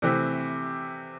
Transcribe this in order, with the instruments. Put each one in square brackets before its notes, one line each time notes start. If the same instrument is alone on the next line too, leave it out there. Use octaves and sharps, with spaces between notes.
[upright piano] C3 E3 A3 C4